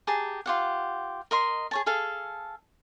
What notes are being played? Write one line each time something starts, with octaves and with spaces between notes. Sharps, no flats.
G4 G#4 A5 A#5
F4 G4 F#5
A#4 D#5 C6
G#4 C#5 A5
G#4 A4 F5 A5